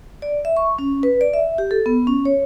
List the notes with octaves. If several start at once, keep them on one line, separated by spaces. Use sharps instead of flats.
D5
E5
C#6
C#4
B4
D5
E5
G4
A4
B3
C#4
C#5